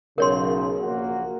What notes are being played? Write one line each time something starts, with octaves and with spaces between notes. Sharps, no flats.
B1 C#3 A#4 C#5 C6
A#1 A#3 F#4